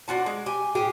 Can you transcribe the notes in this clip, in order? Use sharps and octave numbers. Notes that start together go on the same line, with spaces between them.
D4 F4 F#4 A5
G#3
G4 G#5
A2 G4 G#4